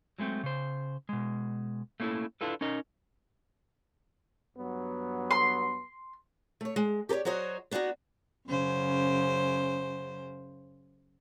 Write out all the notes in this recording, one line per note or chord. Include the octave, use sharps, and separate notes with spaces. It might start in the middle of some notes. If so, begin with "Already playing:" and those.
F#3 G#3 A3 C4
C#3 C5
B2 G#3
A3 A#3 C#4 D#4 E4 A4
D4 E4 F4 A4 B4
C#4 D#4 A#4 D#5
G2 F#3 B3
C6
A3 C#5
G#3
G4 A4 B4 C#5 D5
F#3 F#4 C5 C#5 D#5
B3 D4 D#4 F4 F#4
F#2 C#3 C5